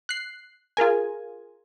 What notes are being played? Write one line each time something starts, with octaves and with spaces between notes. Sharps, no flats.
F#6 C7
F4 G#4 A#4 G#5